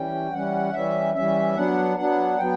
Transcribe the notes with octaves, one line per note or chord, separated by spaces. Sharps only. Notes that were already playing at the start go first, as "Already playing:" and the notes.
Already playing: E3 G3 C#4 G5
E3 G3 C#4 F#5
E3 G3 C#4 E5
E3 G3 C#4 E5
F#3 B3 D4 F#5
F#3 B3 D4 F#5
F#3 B3 G5